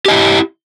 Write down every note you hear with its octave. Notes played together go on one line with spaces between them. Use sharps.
E4 G4 D#5